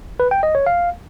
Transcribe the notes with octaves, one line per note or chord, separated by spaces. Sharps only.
B4
G5
D#5
C#5
F5